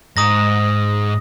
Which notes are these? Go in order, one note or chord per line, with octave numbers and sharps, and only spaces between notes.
G#2 A#5 D#6 A#6